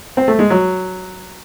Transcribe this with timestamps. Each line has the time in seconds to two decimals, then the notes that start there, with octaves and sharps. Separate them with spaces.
0.17 C4
0.28 A3
0.39 G#3
0.50 F#3